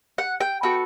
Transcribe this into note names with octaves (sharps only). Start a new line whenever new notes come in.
F#5
G5
B3 F#4 A4 G5